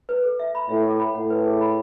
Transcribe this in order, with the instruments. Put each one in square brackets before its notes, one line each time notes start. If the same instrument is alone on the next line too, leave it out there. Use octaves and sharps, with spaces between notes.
[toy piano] B4
A4
E5
B5
[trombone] A2 [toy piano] E5
[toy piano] A4
B5
[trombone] A2 [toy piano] F#5
[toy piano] B4
G#4
B5